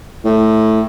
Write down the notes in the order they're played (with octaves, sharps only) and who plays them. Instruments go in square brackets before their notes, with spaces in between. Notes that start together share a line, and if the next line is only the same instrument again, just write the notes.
[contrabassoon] A2